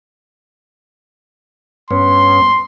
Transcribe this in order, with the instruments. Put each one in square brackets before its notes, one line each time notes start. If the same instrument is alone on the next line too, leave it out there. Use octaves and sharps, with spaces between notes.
[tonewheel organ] G2 B3 C#4 [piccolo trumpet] C6